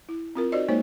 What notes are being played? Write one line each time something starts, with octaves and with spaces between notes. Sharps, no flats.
E4
C4 F4 A#4
D#4 F#4 C5 D5 D#5
G#3 A#3 D#4 C5 C#5